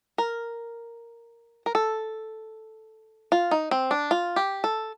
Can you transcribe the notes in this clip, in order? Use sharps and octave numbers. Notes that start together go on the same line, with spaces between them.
A#4
A#4
A4
F4
D#4
C4
D4
F4
G4
A4